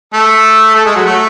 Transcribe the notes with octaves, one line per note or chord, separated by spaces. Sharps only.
A3 A4
A3 A4
G#3 G#4
F#3 F#4
A3